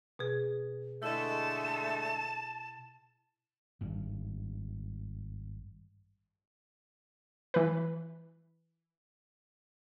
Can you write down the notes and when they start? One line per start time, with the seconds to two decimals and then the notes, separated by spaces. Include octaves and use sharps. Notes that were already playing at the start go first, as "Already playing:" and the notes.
0.19 B2 G#4
1.03 D3 G#3 A3 E4 D#5 A5
3.81 G#1 G2
7.54 E3 B4